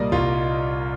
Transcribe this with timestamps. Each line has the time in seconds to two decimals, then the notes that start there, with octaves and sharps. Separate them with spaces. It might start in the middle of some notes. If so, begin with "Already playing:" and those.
Already playing: C2 A#2 G3 A#3 D5 D#5
0.12 C2 F4